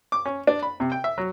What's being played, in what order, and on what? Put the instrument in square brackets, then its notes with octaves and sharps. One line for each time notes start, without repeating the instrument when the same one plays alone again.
[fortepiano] D6
C#4
D4
B5
C3
G5
E5
F#3